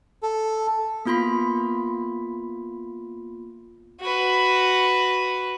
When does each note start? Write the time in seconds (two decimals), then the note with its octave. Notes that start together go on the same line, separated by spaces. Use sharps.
0.23 A4
1.05 A#3 B3 F4 B5 C6 B6
4.00 F#4 B4